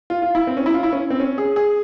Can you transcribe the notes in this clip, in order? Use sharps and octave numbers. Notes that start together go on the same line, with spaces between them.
F4
F4
E4
C4
C#4
E4
F4
E4
C#4
C4
C#4
G#4
G#4